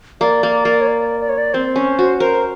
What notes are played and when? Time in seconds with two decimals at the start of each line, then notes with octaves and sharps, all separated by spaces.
0.21 A#3 D5
0.43 A#3
0.65 A#3
0.81 C#5
0.87 D5
1.21 D5
1.29 C#5
1.38 D5
1.54 C4 C5
1.76 C#4
1.99 F#4
2.20 A#4 C5